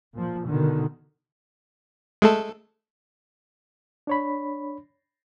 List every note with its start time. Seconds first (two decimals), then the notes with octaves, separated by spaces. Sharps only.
0.13 A#2 F3
0.47 B2 D3 D#3
2.22 G#3 A3 A4
4.07 D4 C#5 B5